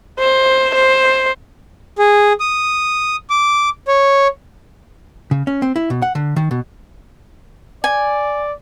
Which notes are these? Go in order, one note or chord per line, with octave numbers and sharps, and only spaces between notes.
C5
C5
G#4
D#6
D6
C#5
C#3
C#4
C4
E4
B2
F#5
D3
D#3
B2
D5 G#5